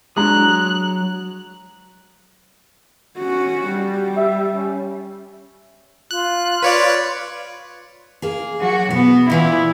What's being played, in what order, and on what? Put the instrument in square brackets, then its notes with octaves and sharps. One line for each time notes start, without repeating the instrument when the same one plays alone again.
[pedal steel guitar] F#3 A#5 D#6 [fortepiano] G#3 D4 [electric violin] F#6
[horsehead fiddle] C#4 F#4
G3
[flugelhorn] E5
C#4
[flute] F4 [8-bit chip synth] F#6
[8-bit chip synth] B4 C#5 D5
[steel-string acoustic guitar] A#3 G#4
[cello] F#3 F#4
[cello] B2 B3 [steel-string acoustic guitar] F#4
[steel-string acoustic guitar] A#2 E3 B3 [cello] E4